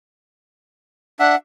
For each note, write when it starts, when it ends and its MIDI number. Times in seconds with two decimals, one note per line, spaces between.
1.20 1.35 62
1.20 1.35 76
1.20 1.36 78